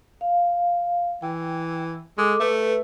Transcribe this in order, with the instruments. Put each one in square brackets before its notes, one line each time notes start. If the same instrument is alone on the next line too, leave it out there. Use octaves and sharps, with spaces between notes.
[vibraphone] F5
[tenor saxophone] E3 [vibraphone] G5
[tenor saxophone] G#3 [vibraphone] A4 D6
[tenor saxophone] A3 [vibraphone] B4